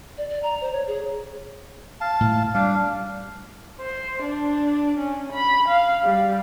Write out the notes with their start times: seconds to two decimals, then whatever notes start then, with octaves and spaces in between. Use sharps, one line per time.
0.18 D5
0.30 D5
0.43 A#5
0.61 C5
0.72 C#5
0.87 G#4
2.01 F5 A5
2.21 A2
2.55 G3 D4 F5
3.81 C5
4.23 D4
4.98 C#4
5.32 B5
5.69 F5
6.04 G3